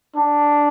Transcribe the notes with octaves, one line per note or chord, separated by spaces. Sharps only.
D4